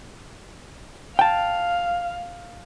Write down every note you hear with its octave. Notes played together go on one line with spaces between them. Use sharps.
F5 G5 A5